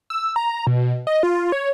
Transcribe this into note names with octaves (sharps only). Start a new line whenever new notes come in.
E6
A#5
B2
D#5
F4
C#5